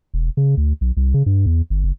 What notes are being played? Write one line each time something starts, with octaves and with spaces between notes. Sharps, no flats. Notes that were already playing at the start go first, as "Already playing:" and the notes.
E1
C#3
D2
B1
C2
C#3
G2
E2
G1
F#1